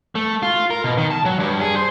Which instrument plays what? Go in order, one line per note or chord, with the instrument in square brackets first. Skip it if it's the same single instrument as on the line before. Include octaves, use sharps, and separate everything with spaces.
[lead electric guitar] A3
F4
A#4
B2
D#3
A5
F#3
G2
G#4
C5